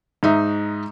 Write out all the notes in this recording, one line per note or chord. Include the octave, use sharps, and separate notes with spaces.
G#2 D#4 E5